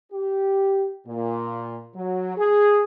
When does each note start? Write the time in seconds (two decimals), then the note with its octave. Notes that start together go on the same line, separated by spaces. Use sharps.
0.12 G4
1.07 A#2
1.95 F#3
2.37 G#4